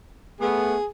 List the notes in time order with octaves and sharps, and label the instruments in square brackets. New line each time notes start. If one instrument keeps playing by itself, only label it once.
[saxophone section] A3 B3 [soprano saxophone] G#4